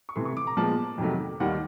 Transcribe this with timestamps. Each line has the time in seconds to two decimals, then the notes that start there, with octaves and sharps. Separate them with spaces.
0.09 C#6
0.16 C3 E3 A3 C6
0.25 C#6
0.37 D6
0.47 A#5
0.57 A#2 F3 G#3 B3 A5
0.98 F2 C3 D#3 F#3 A3
1.40 D#2 D#3 G3 F#5